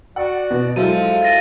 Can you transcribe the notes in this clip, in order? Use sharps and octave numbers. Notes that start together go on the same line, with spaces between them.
F#4 D5 F#5
B2
F3 F#3 G#3 E4 A4 D#7
A6 A#6 D#7